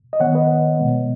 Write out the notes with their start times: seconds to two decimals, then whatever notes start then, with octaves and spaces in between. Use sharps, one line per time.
0.13 D#5
0.20 D#3 B3 C#5 F#5
0.35 B4 D#5
0.79 B2 G#3 B3